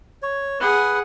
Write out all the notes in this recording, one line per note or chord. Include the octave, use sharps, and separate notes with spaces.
C#5
G#4 B4 F#5